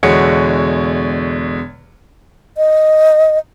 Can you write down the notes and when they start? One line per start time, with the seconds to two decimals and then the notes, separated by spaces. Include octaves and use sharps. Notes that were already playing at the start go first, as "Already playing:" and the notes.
0.03 E2 B2 D3 G#3 C#5 C#7
2.57 D#5